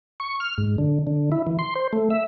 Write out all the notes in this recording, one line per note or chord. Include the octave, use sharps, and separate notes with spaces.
C#6
F6
G#2
D3
D3
E4
E3
C6
C5
A3
E5